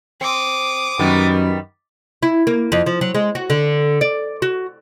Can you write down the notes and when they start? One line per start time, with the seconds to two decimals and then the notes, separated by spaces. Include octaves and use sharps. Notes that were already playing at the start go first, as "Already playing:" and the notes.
0.21 C4 D6 D#6
0.99 F#2 D#3 G3 B3
2.23 E4
2.47 A#3
2.72 F2
2.86 F3
3.01 F#3
3.14 G#3
3.35 F#4
3.50 D3
4.01 D5
4.42 F#4